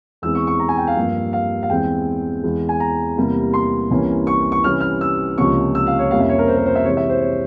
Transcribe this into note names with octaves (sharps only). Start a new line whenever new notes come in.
E2 E3 G#3 C4 E6
C#6
C#6
A#5
G#5
G5
F5
G2 F3 A#3
F5
F5
E2 E3 G#3 C4 G5
E2 E3 G#3
G#5
A#5
E2 C3 E3 G3 A#3
C6
C2 C3 E3 A#3 C#4
C#6
C#6
C3 E3 G3 C#4 F6
F6
E6
C#2 C3 F3 A#3 C#4 C#6
E6
F5
C#5
F2 C3 G3 A#3 C#4 F5
E5
C#5
A#4
C5
A#4
C5
E5
C3 E3 G#3 C#5
E5
C5
C#5